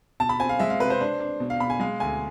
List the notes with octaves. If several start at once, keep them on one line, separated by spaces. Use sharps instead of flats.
B2 A5
B5
C4 G#5
F5
G#3 E5
F5
C3 B4
C5
D4
D4
B2
F5
B2 B5
G#5
G#3 F5
D2 G#5